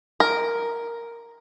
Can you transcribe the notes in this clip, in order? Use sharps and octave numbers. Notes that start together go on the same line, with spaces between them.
A#4